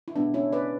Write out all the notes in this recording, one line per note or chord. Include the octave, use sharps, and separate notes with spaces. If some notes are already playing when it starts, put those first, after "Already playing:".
E4
B2 G#3 B3 D4
C#4 E4
B4 D5